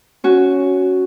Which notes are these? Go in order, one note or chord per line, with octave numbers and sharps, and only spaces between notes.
C#4 F#4